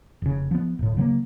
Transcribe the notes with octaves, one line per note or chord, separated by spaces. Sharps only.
F1 C#3
F3 B3
D1 A2
C#3 F#3 G3 A#3